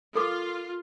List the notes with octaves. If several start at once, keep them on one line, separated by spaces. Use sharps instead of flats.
F4 A4 A#4 D6